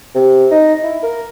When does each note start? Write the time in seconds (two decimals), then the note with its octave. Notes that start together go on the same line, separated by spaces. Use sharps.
0.15 C3
0.51 D#4
0.83 E4
1.03 A#4